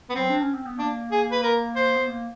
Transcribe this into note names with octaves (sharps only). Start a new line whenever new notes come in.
B3
F#3 C4
D4
C#4
C4
B3
A#3 D4
G#4
B4
A#4
C5
B3
A#3